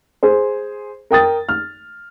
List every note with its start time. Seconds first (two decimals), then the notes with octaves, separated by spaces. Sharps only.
0.23 G#4 C5
1.11 A#4 G5 D#6 A6
1.49 F6